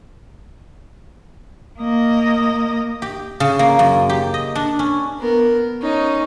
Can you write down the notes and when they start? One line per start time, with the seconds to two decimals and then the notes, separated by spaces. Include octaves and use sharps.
1.79 A#3 D#5
3.02 G4
3.40 C#3
3.59 A#3
3.79 F#2
4.09 G4
4.34 D#5
4.55 D4
4.79 C#4
5.19 B3 A#4
5.81 C#4 D#4